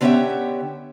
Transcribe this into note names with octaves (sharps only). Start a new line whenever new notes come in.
D3 B3 C#4 G4 E5 G5